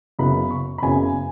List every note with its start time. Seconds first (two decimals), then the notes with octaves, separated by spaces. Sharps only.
0.19 F#1 F#2 C#3 B3 B5
0.50 C#6
0.78 B5
0.82 F#1 F#2 C#3 B3 G#5